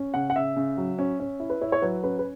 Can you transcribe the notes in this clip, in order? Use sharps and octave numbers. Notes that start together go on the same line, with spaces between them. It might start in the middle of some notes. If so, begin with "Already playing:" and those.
Already playing: C#4
C#3 F#5
F#5
C#3 E5
C#3
F#3
C#4
C#4
E4
B4
E4 C#5
C#5
F#3 B4
C#4 B4
B4